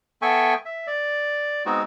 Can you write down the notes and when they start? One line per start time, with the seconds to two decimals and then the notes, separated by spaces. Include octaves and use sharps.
0.22 B3 A4 E5 G5 G#5 C#6
0.65 E5
0.87 D5
1.66 G#3 B3 C4 D#4 F#4